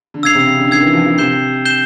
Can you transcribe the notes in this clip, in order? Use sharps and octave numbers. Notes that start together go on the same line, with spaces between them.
D3
C#3 E6 G#6 C7 F7
C3
C#3
D3
D#3 E6 G#6 C7 F7
E3
F3
F3
C3 G6 C7 E7 G7
G6 C7 E7 G7